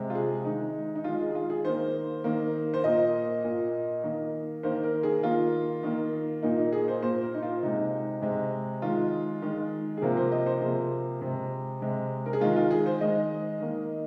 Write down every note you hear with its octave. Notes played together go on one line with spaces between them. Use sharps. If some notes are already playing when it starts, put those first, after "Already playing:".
Already playing: C3 G#3
F4
G#4
D#3 G#3 D#4
D#4
D#3 G#3 F4
G#4
G#4
F4
G#4
D#3 A#3 C5
D#3 A#3
C5
A#2 A#3 D#5
A#2 A#3
D#3 A#3
D#3 A#3 C5
A#4
G#4
D#3 A#3 F4
D#3 A#3
A#2 A#3 D#4
D#4
G#4
C5
A#2 A#3 C5
A#4
D#4
F4
C3 G#3 D#4
C3 G#3
D#3 G#3 F4
D#3 G#3
G#4
C3 F3 A#3 A#4
C5
D#5
C5
C3 F3 A#3 G#4
C3 G#3
C3 G#3
A#4
G#4
D#3 G#3 F4
F4
G#4
C5
D#3 G#3 D#5
D#3 A#3